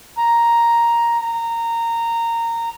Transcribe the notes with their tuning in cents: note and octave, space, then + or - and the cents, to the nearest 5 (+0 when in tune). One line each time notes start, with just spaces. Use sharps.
A#5 +5
A#5 -15